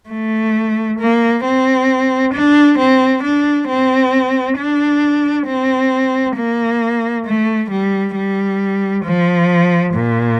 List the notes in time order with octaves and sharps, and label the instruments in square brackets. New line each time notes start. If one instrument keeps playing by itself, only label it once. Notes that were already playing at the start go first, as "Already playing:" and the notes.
[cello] A3
A#3
C4
D4
C4
D4
C4
D4
C4
A#3
A3
G3
G3
F3
A#2